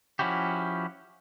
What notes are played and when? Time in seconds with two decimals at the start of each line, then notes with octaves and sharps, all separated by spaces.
0.19 F3 C#4 E4 F#4 G4